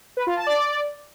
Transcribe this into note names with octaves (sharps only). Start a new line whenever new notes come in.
B4
F4
A5
D5